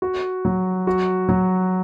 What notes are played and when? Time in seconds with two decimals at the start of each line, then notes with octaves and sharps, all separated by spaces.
0.02 F#4
0.45 F#3
0.87 F#4
1.29 F#3